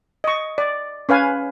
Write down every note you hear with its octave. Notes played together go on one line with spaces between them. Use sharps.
D#5 C#6
D5
C#4 B4 F5 G#5